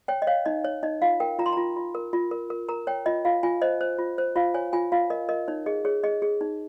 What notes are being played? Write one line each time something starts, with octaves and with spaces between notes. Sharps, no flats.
C#5 G5
D#5
C#5 F5
D#4 D#5
C#5
D#4 D#5
F4 F5
A#4 G5
F4 A#5
C6
F4 A#5
F4
A#4
F4
A#4
A#4
A#4 A#5
C#5 G5
F4 D#5
F4 F5
F4 G#5
C5 D#5
C5
F4
C5
F4 F5
C#5 G#5
F4 G#5
F4 F5
A#4 D#5
A#4 D#5
D#4 C#5
G#4 D#5
G#4 C#5
G#4 D#5
G#4
D#4